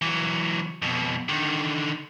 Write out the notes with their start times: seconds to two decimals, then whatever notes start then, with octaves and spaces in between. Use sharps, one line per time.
0.02 E3 F#3
0.82 F2 B2
1.29 D3 D#3